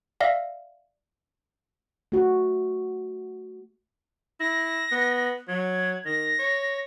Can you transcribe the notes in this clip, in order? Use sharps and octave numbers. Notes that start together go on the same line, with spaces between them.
D5 E5 F5 A#6
A3 F#4
E4 A#6
B3
F#3 G#6
D#3 A#6
C#5